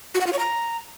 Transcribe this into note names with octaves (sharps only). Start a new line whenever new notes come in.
F#4
F#5
F4
C#5
A#5